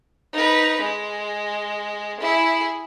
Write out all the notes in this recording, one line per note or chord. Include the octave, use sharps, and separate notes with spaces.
D#4 B4
G#3
E4 G#4